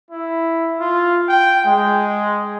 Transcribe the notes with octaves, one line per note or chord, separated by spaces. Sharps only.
E4
F4
G5
G#3